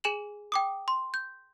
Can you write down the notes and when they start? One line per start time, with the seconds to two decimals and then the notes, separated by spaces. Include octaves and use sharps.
0.04 G#4 G#5 E7 F#7
0.52 G5 D6 D#6
0.88 C6
1.14 G6